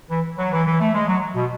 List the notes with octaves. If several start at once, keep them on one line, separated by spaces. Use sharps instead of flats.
E3
F#3
E3
E3
A3
G#3
F#3
B2